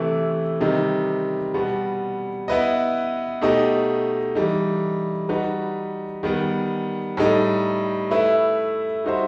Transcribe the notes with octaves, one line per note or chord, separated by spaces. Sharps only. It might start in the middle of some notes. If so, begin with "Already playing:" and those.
Already playing: C3 E3 A3 E4 B4
C3 D#3 G3 D#4
B2 G3 B3
B3 E4 B4 D#5
B2 A3 D#4 G4 D#5
E3 G3 D#4
G3 D#4 F#4 B4
D#3 G3 B3
A2 G3 D#4
A3 E4 B4 E5
G3 D#4 F#4 C5 E5